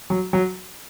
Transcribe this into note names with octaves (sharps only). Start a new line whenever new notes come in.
F#3
F#3